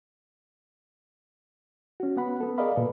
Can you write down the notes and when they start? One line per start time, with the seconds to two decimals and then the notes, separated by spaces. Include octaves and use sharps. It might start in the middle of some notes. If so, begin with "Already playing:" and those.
2.00 C#4 F#4
2.17 B3 F#5 B5
2.41 B3 A4
2.58 G#4 A#4 D5 D#5 F5 B5
2.76 A#2 A4 B4